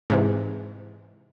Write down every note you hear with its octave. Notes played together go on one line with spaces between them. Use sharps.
G#2 C3 E3